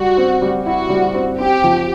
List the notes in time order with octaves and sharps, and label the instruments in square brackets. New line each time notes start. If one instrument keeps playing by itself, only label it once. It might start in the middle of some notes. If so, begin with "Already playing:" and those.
Already playing: [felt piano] G3 [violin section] F#4
[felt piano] C4
G3
[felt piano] E4 [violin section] F#4
[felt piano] G3
C4
[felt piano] C4 [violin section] G4
[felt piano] F3